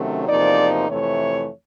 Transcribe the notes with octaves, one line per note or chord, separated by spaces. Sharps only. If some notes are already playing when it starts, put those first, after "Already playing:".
Already playing: C3 D#3 F#3 A3 C#4
E2 C3 F3 A#3 D#4 D5
F2 C3 E3 A3 C#5